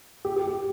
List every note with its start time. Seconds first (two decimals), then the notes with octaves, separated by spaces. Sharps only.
0.25 G4
0.36 G4
0.47 G4